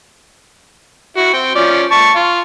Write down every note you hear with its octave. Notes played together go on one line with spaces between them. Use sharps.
E4 F#4
C4 G5
F3 C#4 D5
A5 C#6
F4